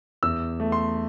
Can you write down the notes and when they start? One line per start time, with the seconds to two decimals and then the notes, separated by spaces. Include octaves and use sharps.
0.23 E2 E6
0.60 A3
0.72 C6